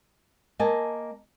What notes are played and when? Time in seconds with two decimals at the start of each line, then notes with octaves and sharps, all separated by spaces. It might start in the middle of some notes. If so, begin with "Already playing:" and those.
0.59 A#3 D#5 G#5 A5